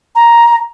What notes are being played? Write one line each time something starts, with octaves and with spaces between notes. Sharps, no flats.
A#5